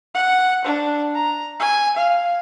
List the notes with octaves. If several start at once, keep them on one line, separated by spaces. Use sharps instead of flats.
F#5
D4
A#5
G#5
F5